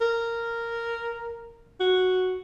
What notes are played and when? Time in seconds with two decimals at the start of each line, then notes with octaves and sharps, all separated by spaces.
0.01 A#4
1.80 F#4